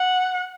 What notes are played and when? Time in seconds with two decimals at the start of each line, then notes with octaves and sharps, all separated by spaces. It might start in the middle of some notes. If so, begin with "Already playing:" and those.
Already playing: F#5